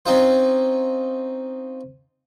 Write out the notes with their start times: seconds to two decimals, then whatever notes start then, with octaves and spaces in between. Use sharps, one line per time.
0.06 C4 C#4 D#4 F4 C5